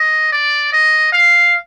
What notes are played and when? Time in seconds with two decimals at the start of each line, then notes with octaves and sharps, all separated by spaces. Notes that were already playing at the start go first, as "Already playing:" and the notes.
Already playing: D#5
0.32 D5
0.73 D#5
1.13 F5